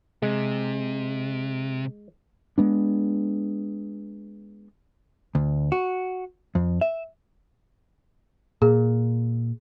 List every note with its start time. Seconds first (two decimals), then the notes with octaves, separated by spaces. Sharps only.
0.22 C3 G#3
2.58 G#3 B3 D4
5.35 D2
5.72 F#4
6.55 F2
6.81 E5
8.62 A#2 G#4